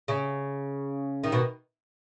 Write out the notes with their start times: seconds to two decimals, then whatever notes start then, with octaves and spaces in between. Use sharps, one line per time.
0.08 C#3
1.24 D#3
1.32 B2